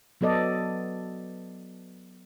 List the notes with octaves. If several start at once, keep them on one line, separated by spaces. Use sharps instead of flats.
F#3 B3 A4 D5 D#5